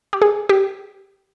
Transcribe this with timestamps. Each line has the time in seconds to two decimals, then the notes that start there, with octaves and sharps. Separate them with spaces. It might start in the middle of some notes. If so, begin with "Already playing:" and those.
0.13 G4
0.22 G#4
0.49 G4